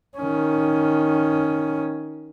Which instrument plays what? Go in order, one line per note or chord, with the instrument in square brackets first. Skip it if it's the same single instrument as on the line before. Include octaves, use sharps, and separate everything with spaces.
[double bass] D#3 C#4